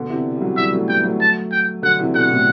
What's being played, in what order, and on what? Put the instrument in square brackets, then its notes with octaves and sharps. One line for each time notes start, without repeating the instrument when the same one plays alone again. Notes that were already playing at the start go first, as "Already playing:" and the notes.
Already playing: [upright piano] B2 D3
C3 E3
G3
D3 F#3
[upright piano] E3 G3 [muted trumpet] E5
[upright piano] F#3 A3
[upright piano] G3 B3 [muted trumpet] G5
[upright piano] F#3 A3
[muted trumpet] A5
G5
[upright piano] D3 F#3 [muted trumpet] F#5
[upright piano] C3 E3
[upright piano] B2 D3 [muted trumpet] F#5
[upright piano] A2 C3